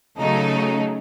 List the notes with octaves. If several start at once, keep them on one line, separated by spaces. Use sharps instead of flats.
C#3 F#3 A3 D#4 A4